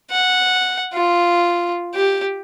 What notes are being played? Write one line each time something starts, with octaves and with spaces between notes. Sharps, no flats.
F#5
F4
G4